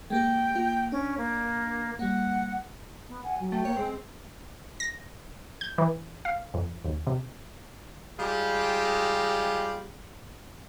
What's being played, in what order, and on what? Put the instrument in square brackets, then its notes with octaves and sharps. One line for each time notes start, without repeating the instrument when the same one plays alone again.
[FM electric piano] G#3 A#3 G4 [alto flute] G5
[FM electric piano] A#3 F4
[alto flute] C#4 [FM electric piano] D4
[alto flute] A#3
[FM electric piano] G3 A#3 [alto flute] F#5
[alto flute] B3
[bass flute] F#5 [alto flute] G#5
[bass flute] F#3
[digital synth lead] A3 [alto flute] G5
[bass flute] A#3 [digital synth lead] C#5
[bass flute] G#3 [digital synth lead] C4
[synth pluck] A#6
G6
E3
F5
F2
D#2
C3
[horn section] G3 G#3 F4 G4